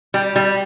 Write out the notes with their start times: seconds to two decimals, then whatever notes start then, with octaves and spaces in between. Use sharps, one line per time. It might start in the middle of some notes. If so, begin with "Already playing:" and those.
0.14 G3
0.36 G3